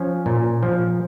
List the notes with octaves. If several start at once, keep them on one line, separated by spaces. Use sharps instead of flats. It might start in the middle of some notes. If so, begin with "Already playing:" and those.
Already playing: F3 C#4
A#2
F3